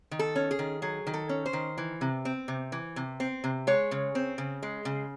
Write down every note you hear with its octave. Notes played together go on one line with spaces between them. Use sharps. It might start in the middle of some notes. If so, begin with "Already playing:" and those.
D#3
A4
C#4
G#4
D#3
F#3 G#4
D#3
A4
C#4
C5
D#3
E3
C3
C4
C3
E3
C3
C4
C3
G#3 C#5
C#3
C4
C#3
G#3
C#3